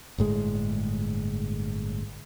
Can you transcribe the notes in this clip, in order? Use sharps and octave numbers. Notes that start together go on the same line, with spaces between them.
G1 A2 G#3